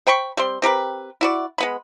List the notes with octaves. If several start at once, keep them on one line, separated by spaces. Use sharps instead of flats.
C5 G5 B5 C#6
G3 C4 C6
C4 G4 A#4 B4
E4 F#4 D5
G#3 B3 B5